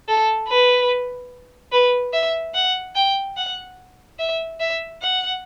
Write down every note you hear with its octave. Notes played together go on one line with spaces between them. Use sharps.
A4
B4
B4
E5
F#5
G5
F#5
E5
E5
F#5